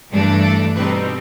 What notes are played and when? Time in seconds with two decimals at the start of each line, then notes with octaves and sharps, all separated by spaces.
0.11 G2 E3 A3 D4
0.43 A4
0.76 B2 G3 C4 D#4 B4